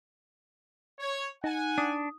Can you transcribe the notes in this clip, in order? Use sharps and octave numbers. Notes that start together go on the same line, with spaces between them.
C#5
D#4 F#5 G#5
D4 D#6